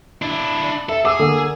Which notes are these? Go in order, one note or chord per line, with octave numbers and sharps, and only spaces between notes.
D4 E4
A4 E5
G#4 D6 E6
D3 A#3